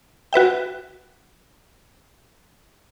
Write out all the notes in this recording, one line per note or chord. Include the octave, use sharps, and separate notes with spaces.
F#4 B4 E5 G5